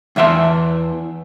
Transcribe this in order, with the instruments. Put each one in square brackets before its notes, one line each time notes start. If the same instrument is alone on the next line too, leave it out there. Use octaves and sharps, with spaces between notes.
[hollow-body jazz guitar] E2 E3 E5 A5 C6